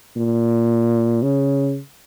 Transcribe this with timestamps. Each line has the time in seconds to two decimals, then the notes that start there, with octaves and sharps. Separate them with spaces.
0.17 A#2
1.23 C#3